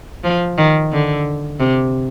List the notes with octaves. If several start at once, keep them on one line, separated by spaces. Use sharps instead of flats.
F3
D#3
D3
C3